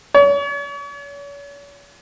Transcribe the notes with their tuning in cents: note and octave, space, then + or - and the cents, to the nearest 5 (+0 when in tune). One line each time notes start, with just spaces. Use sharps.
C#5 +40